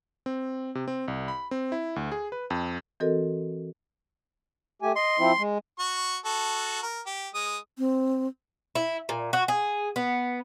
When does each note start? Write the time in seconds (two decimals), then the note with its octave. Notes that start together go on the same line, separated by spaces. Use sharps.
0.26 C4
0.75 C3
0.88 C4
1.08 C2
1.28 B5
1.51 C4
1.72 E4
1.96 D2
2.12 G#4
2.32 B4
2.50 F2
3.00 E3 C4 F#4 A4 A#4 D#5
4.82 A3 G4 G#5
4.96 D#5 C6
5.19 F3 C4 E4
5.38 G#3
5.79 F#4 C#6
6.25 F#4 A4
6.83 A#4
7.06 G4
7.35 G#3 D#6
7.78 C4
8.75 E4
9.09 A#2
9.33 F#4
9.48 G#4
9.96 B3